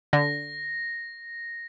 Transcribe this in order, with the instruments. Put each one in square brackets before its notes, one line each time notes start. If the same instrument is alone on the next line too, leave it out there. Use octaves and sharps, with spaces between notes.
[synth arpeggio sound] D3 [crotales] A#6